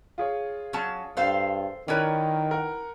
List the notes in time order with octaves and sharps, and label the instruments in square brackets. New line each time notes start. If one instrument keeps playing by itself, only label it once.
[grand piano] F4 G#4 C#5
[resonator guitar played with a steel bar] F#3 C#4 A5
[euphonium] G2 [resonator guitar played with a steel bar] A4 C5 F5
[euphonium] D#3 [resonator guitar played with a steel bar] C#4 E4 B4 [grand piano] A#4 C#5 D5
[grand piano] A#4 F#5